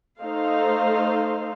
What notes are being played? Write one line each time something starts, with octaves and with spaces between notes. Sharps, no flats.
A3 D#4 A4 C5 F5